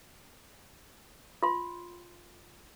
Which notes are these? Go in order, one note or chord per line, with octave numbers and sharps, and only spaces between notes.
F4 C6